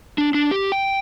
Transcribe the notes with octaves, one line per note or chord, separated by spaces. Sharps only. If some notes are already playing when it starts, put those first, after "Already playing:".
D4
D4
G4
G5